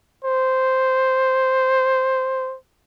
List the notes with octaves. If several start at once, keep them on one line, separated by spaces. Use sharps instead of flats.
C5